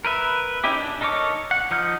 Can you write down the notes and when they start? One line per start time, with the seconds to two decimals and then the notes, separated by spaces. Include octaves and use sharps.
0.05 A#4 B4 E5
0.64 C#4 D#4 E4 G4
0.77 D4
1.01 D#4 A4 A#4 C#5 D6
1.51 F#5
1.71 F3 D#4 F6 G6